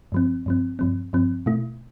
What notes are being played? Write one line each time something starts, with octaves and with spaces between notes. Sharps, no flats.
G2 F3 C4
G2 F3 C4
G2 F3 C4
G2 F3 C4
B2 A3 E4